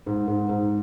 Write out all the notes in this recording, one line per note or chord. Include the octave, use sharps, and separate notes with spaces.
G#2
G#2
G#2